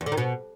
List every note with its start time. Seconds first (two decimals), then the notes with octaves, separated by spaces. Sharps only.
0.01 E2
0.06 D3
0.12 D#3
0.17 B2